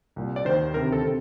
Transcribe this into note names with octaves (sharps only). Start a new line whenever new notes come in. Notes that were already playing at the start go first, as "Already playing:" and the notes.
C2 A#2
D5
D#2 D#3 C5
D2 C3 D#3 A#4
A4
C3